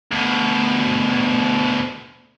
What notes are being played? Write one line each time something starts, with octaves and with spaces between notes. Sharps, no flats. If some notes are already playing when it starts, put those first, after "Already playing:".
D2 B2